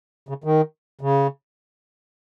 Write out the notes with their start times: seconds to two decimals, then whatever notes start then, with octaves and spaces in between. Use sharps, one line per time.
0.29 C#3
0.44 D#3
1.01 C#3